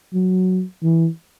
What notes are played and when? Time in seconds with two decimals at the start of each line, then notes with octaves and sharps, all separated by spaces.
0.14 F#3
0.83 E3